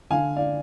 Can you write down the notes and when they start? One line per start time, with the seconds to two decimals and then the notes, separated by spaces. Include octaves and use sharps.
0.10 D3 F5 G#5
0.36 D5 F5